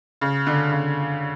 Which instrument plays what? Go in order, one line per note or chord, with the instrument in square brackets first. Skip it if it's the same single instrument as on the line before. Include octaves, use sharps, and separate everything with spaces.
[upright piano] C#3
D3
C#3